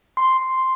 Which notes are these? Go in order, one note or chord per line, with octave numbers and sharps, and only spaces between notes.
C6